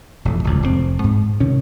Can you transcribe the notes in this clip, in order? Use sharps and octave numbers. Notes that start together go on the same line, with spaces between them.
E1 F2 A2
D1 C#2
F1 B2 C4
G#2
C3 D#3 C#4